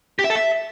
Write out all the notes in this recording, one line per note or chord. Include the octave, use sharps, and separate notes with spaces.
G4
E5
A4
E5